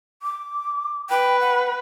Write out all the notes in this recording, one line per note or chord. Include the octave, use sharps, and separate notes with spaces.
D6
B4 G5
F#5